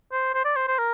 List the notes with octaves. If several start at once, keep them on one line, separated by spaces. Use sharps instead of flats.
C5
C5
D5
C5
C5
A#4